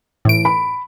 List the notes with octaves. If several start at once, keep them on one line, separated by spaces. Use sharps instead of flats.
A2 E3 D7
B5